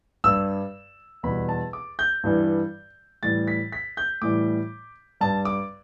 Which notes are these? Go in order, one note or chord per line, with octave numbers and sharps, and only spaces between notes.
G2 G3 E6
E2 B2 G3 B5
A5
D6
G6
G2 E3 G3
A2 E3 G3 A6
B6
B6
G6
A2 E3 G3 D6
G2 G3 A5
D6